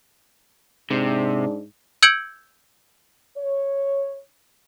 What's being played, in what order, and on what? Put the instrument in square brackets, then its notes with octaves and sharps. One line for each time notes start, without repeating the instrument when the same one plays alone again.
[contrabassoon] G#2 [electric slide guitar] C3 [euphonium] D4
[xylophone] E6 G6 G#6 C#7 D7 F#7
[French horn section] C#5